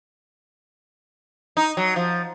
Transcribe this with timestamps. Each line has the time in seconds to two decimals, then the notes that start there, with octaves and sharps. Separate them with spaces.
1.57 D#4
1.77 F#3
1.96 F3